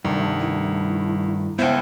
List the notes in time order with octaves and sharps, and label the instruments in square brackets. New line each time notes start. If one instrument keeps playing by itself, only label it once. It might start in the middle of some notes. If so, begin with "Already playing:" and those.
[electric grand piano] C2 [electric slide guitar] G2 D#3 A3
[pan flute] E4
[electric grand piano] C#2 E4 [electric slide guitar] B3 G5 [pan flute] C5